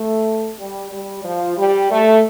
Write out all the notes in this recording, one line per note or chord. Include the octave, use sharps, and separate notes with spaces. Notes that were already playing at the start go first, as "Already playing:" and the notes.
Already playing: A3
G3
G3
F3
G3
A3